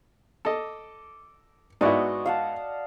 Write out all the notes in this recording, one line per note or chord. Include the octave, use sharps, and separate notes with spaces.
A4 D#5 D6
G#2 B3 E4 F#4 D5 D#5
F5 F#5 A5